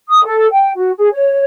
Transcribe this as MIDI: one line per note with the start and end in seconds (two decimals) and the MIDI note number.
0.08 0.22 87
0.24 0.47 69
0.52 0.70 79
0.75 0.91 66
0.97 1.08 68
1.12 1.44 73